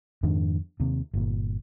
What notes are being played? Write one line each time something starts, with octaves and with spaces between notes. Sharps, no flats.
F2 G#2 D#3 D4
D#2 C3
G1 A#2